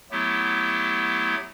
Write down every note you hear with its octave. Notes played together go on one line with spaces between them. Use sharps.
F#3 A3 B3 E4 G4